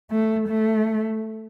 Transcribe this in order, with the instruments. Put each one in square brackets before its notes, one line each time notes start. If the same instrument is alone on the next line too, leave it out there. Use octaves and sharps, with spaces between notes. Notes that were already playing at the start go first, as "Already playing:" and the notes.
[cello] A3
A3